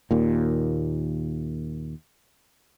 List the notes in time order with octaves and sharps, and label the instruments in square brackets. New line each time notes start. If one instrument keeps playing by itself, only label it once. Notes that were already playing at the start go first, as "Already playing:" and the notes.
[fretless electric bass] D#2 A#2